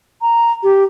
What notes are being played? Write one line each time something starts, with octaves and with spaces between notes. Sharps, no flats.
A#5
G4